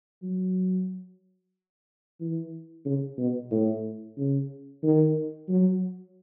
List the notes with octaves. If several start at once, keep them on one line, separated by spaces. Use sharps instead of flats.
F#3
E3
C#3
B2
A2
C#3
D#3
F#3